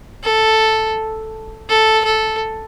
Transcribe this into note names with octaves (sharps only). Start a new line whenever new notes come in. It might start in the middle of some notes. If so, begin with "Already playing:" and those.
A4
A4
A4